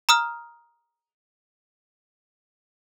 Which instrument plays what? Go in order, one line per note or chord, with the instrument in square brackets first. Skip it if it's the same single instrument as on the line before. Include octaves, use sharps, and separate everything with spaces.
[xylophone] A#5 D#6 F6